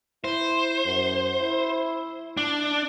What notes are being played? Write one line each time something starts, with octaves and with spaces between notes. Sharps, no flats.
E4 C5
F#2
E4
D4